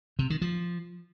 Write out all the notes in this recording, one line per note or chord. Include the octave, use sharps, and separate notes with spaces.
C3
D#3
F3